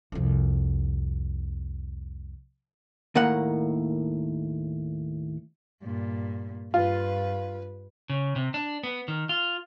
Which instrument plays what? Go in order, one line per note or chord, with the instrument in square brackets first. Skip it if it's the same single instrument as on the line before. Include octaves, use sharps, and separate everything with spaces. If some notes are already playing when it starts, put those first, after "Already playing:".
[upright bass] C2 F2
[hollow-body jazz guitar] D#2 A2 A#3 F#5
[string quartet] G2 A#2
[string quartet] G2 B4 [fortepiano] F4
[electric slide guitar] C#3
C3
D4
B3
D#3
F4